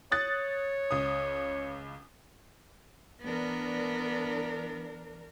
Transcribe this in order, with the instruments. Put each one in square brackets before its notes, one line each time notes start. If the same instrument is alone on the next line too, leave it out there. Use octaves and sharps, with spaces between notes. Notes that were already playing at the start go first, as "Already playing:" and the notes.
[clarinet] C#5 [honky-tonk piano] D#6 F#6 A6
[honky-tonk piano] C#2 D#6
[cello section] E3 D4 A#4 [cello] B3